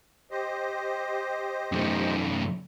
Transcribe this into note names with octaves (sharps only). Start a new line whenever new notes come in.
G4 C5 D#5
F#2 A3